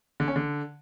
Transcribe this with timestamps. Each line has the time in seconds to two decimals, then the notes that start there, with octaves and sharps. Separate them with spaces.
0.20 D3
0.28 C#4
0.36 D3